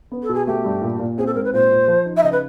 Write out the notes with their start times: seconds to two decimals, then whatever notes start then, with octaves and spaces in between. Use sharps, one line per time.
0.12 B3
0.23 A4
0.29 B2
0.34 G#4
0.47 A3 G4
0.65 G2
0.82 A#2
0.99 A#2
1.18 C4 G#4
1.26 A4
1.35 G#2 A#4
1.45 B4
1.53 A#2 C5
1.71 A#2
1.88 F3
2.06 D#4
2.17 E5
2.23 C#3 D#5
2.32 B4